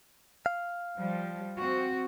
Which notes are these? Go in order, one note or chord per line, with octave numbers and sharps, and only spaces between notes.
F5
F3 G3
C4 F#4